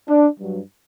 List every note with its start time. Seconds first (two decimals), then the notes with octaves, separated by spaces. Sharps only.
0.08 D4
0.38 G2 F#3